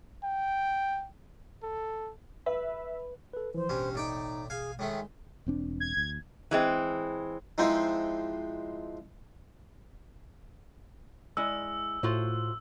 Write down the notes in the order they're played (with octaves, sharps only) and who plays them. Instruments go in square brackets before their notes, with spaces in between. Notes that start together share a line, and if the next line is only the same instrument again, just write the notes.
[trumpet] G5
A4
[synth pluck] B4 [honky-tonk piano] E5
[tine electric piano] A4 B4
[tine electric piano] E3 F3 [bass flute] C5
[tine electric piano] A1 B2 [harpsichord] G2 C#4
[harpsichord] A2 D5 G5 [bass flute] D#4
[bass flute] G#4 [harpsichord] F5 G#5
[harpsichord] A2 D#3 A3 [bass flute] G#3
[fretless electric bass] E1 C4 D4
[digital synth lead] G#6
[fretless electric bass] D2
[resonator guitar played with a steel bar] E3 G#3 C4
[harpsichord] E3 F3 G#3 C4 D#4
[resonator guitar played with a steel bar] G#3 E4 D5 [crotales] E6
[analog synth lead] A2 [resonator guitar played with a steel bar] F4 F#4 C5